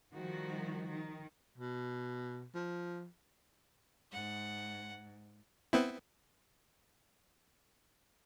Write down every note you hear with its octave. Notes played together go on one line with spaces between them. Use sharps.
D#3 F3 G3 F#4
D#3
B2
F3
G#2 F#5
B3 C4 E4